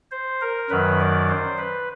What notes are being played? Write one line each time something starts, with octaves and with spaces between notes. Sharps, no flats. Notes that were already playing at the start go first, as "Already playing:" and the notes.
C5
A#4
F#2 D#3 F#3 B4
D5
C5
B4